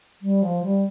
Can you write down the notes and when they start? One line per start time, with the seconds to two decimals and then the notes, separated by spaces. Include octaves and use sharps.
0.21 G3
0.42 F3
0.63 G3